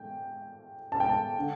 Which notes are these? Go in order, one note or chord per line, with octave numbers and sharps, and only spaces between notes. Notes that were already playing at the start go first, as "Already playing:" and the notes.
Already playing: G5
A5
G5
A5
D3